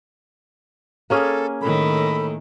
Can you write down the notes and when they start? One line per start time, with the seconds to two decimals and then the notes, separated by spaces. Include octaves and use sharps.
1.10 A#3 C#4 G#4 A4
1.62 A2 D#3 A4 B5